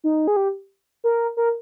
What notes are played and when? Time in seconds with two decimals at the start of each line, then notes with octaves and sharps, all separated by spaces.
0.04 D#4
0.27 G#4
0.36 G4
1.04 A#4
1.37 A#4